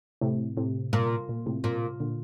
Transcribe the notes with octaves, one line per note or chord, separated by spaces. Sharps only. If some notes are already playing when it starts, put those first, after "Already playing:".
A2 C3
A2 C3
A#2
A#2
A2 C3
A#2
A#2 D3